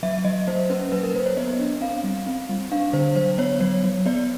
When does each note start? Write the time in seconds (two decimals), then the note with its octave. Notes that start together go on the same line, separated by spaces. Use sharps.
0.03 F#3 E5
0.24 F#3 D#5
0.48 A#3 C5
0.70 C#4 B4
0.92 F#3 B4
1.03 A#4
1.14 F#3 C5
1.26 C#5
1.37 B3 D#5
1.59 D4
1.81 C4 F5
2.03 G3
2.26 C4
2.49 G3
2.71 D4 F5
2.93 D3 C5
3.16 F#3 C5
3.38 B3 C#5
3.60 F#3 C#5
3.84 F#3
4.06 B3 D5